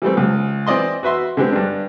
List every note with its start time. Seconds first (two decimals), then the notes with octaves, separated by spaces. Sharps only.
0.02 E3 G3 A3 C4
0.17 C#2
0.67 E3 C4 D5 D#5 C6
1.03 F#4 B4 E5 C6
1.37 D3 G#3 B3 C4 G4
1.52 G2 D4